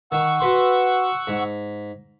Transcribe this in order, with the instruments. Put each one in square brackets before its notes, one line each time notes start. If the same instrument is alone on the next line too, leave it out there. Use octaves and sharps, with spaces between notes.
[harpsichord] D#3 [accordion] F#5 C#6 E6
[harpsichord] F#4 B4 C6
G#2